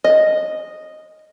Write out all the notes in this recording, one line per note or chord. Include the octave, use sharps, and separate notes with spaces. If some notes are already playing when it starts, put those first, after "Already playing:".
D#5